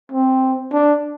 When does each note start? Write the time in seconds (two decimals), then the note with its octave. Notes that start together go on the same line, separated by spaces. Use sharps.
0.12 C4
0.73 D4